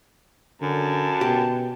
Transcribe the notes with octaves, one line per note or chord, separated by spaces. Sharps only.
F#2 D3 A5
B2 G4